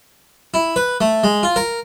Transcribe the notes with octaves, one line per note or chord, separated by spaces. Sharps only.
E4
B4
A3
G#3
F4
A#4